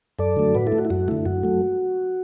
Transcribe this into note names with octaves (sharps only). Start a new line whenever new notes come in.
F#2 A4 D5
D3 F#3 A3
A2 F#4 B4
E4 A4
A3
F#4
E4
F#2 F#4
D3 A3 E4
F#2 F#4
F#3 A3